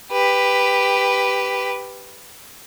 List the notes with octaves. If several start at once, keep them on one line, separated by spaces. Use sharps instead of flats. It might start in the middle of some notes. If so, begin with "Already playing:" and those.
G4 B4